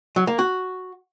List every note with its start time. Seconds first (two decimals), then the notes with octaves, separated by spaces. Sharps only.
0.16 F#3
0.27 A#3
0.39 F#4